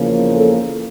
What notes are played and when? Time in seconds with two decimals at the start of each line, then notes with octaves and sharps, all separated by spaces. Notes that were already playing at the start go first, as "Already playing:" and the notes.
Already playing: E2 C#3 F3 A#3
0.34 A4